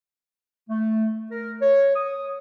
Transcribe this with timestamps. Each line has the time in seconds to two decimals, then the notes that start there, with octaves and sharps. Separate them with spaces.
0.70 A3
1.31 A#4
1.61 C#5
1.95 D#6